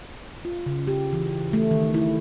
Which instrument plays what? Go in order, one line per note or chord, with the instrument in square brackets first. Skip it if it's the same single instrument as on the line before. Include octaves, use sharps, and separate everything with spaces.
[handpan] F4
C#3
G4
E3
A3
D#3
E4